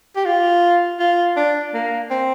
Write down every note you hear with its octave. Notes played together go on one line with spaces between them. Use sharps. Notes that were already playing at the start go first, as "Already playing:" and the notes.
G4
F4
F4
D4
A#3
C4